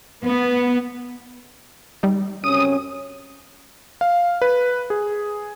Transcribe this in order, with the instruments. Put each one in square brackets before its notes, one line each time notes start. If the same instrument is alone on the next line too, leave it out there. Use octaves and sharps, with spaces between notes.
[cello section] B3
[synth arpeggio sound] G3 D#4
[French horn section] F#2 C3 C#4 [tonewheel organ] D#6
[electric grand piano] F5
B4
G#4